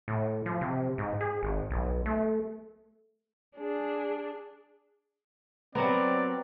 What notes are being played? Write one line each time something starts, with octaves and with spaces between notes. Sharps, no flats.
A2
F3
C3
G#2
G#4
G#1
B1
A3
D4 G#4
F#3 B3 C4 A#4 D5